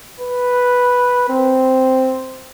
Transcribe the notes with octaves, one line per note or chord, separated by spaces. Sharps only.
B4
C4